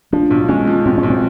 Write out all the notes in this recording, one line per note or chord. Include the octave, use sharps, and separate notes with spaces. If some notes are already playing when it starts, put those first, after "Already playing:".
F3 D4
B1
G#3 C#4
F3
B1 C4
C#4
B1
C4